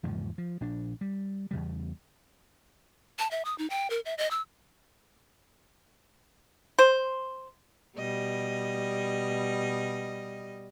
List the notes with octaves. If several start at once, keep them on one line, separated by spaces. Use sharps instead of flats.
E2 G#2 C#3 F3
F3
A#1 D4
G3
E2 C#3 G3
A5
E5
D#6
D#4
G5
A#4
E5
D#5
E6
C5
B2 G3 D#5